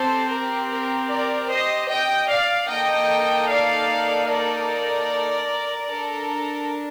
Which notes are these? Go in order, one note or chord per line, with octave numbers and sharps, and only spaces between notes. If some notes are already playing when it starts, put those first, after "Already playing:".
Already playing: C4 G4 A4 C5
A#4
A#4
A#4 D5
C5 D#5
D#5 G5
D5 F5
A#3 D#4 A4 D#5 G5
D5 F5
A#4 D5
D4 A4 A#4